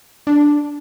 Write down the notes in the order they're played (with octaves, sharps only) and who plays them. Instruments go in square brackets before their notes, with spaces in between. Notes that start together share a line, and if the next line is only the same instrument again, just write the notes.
[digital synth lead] D4